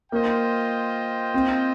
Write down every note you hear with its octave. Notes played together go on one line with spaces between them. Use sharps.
A#3 F4 C5 D#5 G5
C4